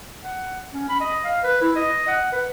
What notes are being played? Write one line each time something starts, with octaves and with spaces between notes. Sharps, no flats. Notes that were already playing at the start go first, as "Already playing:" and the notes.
F#5
C#4
B5
D#5
F5
B4
E4
D#5
F#5
B4